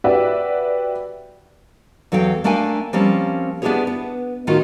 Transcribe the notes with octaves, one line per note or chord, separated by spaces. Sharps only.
F#4 G4 B4 D5 E5
E2 F#3 A4 F5 G5
A3 A#3 D4 F5 G5 G#5
F3 G3 A#3 C4 C#4
B3 D4 E4 G4 G#4 C#5
B3
A2 D#3 D#4 F4 F#4